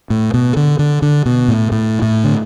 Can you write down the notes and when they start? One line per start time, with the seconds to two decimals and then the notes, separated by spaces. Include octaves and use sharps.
0.10 A2
0.34 B2
0.57 D3
0.79 D3
1.02 D3
1.26 B2
1.48 A2
1.72 A2
2.02 A2
2.24 D3